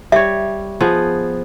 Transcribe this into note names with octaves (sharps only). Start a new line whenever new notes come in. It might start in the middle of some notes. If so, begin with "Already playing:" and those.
G3 C#5 E5
F3 B3 G#4